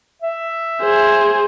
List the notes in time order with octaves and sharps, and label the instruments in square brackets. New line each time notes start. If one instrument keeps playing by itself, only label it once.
[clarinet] E5
[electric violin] G#4 C5